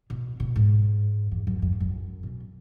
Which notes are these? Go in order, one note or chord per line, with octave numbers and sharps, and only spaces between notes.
B2
B2
G#2
E2
F#2
F#2
G#2
F#2
B2